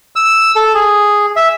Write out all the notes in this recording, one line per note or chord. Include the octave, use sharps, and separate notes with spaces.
E6
A4
G#4
E5